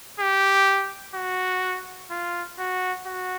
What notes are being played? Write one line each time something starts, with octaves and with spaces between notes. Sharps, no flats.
G4
F#4
F4
F#4
F#4